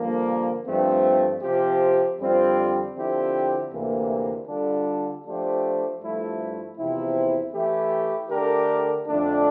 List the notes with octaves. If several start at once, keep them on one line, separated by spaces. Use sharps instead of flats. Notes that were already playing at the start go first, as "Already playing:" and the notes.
Already playing: G2 D3 F3 A#3
G2 F3 A3 C4
C3 F3 C4 G4
F2 D3 G3 C4 F4
D3 F3 C4 E4 G4
D2 C3 E3 A#3
D3 G3 D4 F4 A4
F3 A3 D4 G4 C5
G2 F3 A3 E4
E2 C3 F3 C4 E4
E3 A3 E4 G4
D3 A3 D4 G4 A#4
F2 D3 A3 D4